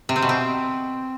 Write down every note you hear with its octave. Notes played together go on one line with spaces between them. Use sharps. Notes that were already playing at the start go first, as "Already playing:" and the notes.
C3
C4
B2
C4